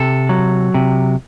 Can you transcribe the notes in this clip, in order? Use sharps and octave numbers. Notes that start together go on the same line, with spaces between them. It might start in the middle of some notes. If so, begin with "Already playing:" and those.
Already playing: C3 A4
F#3
C3